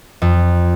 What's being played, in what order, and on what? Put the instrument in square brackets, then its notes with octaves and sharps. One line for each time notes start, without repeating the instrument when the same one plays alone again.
[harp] F2